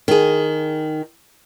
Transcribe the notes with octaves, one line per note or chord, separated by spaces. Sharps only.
D#3 G#4